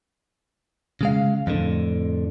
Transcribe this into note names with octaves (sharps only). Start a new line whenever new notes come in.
C#3 G#3 F5
F2 A2 D3